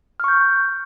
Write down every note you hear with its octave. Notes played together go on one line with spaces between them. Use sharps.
C#6 F6 G6